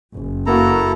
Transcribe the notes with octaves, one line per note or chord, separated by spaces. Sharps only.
F#1
A#3 E4 F#4 A4 A#4 A#5